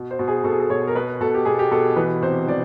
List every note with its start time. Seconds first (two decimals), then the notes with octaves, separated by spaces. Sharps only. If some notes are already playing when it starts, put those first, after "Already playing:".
Already playing: B2
0.11 C5
0.19 B2
0.28 G#4
0.44 B2 A4
0.53 G#4
0.60 A4
0.70 B2 C#5
0.88 A#4
0.95 B2 B4
1.21 B2 A4
1.34 G4
1.45 B2 G#4
1.59 G4
1.71 B2 A4
1.96 E3 B4
2.22 C3 C5
2.47 E3 D5